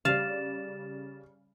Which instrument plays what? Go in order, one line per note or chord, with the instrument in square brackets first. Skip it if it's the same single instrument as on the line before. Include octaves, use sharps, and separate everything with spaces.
[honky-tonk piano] C#3 G3 D5 [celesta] G4 A6 E7 [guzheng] F5